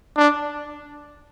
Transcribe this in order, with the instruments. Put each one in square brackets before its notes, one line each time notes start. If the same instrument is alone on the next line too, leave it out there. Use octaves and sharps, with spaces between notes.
[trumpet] D4